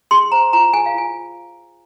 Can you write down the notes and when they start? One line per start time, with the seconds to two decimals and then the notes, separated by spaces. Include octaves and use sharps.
0.11 G#4 C6
0.32 C5 A#5
0.53 F4 A#5
0.73 G#4 G#5
0.86 F5
0.94 F4 G#5